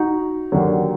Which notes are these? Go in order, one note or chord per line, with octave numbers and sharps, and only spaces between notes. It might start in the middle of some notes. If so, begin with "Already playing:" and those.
Already playing: D#4 F#4
D#2 D3 F#3